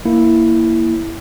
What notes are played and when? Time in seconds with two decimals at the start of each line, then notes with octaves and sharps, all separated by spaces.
0.05 A#3 E4